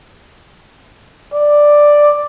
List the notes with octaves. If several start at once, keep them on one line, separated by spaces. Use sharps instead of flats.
D5